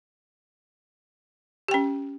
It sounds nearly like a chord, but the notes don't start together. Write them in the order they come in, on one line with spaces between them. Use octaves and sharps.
G4 G5 C#4